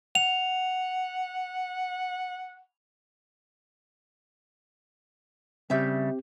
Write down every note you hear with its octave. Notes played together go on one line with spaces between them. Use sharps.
F#5 F7
C#3 G3 C4 G4 E5 G6